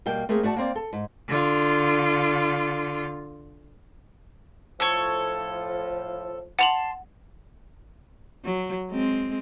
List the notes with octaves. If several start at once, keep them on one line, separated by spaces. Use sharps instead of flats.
B2 G3 A#3 G5
A3 A#3 C4 G#4
A3 F#4 D5 A5
A#3 C4 D5
A4
G#2
D3 F4
A2 F3 A4 C#5
F#5 A5 C6 F7 F#7
F#3
G#3 C4